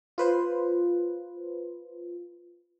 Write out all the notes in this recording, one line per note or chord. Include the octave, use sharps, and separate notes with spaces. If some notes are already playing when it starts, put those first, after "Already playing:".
F4 B4 C5